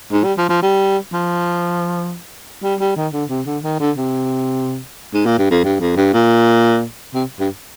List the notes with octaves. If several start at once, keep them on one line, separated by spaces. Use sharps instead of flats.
G#2
G3
F3
F3
G3
F3
G3
G3
D#3
D3
C3
D3
D#3
D3
C3
G#2
A#2
G2
F2
G2
F2
G2
A#2
C3
G2